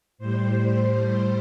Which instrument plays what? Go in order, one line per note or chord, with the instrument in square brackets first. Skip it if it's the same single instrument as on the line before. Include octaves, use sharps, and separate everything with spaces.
[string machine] A2 G3 C5